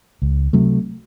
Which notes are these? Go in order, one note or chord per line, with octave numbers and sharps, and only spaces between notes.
C#2
C3 F#3 A3